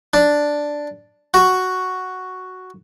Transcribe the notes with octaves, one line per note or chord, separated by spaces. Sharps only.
D4
F#4